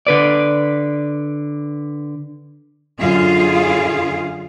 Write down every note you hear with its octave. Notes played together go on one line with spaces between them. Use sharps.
D3 B4 D5
F#2 D3 F4 G#4 F5